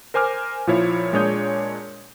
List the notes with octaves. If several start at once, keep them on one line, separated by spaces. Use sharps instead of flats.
A#4 C5 G#5 D6 F6
A#2 F3 E4 C#5 F5
A#2 G#3 D4 C#5 D#6 G6